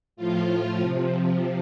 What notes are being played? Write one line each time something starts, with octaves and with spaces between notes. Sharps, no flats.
A2 F3 F4
C3 F3